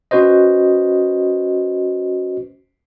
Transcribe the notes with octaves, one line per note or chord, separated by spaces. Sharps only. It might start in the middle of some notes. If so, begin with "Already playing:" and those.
C#4 F#4 B4 C5 D#5